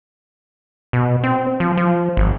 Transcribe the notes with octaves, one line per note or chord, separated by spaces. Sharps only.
B2
C4
F3
F3
G#1